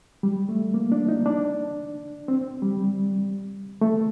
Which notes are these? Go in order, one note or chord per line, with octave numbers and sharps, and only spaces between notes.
G3
A3
A#3
D4
D#4
D4
C4
G3
A3